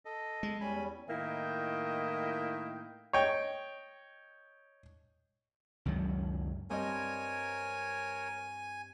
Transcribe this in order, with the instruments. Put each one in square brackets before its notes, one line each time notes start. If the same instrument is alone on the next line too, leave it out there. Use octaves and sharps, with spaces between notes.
[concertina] A4 D#5
[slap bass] G#3
[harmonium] E2 G3 C#4 [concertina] G#5 B5
[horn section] A2 D#3 A#3 E4 D#5 G5
[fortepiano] C#5 D#5 G5
[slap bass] C#2 F#2 D#3 F#3
[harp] G2 C4 D#5 [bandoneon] A#4 C#5 [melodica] G#5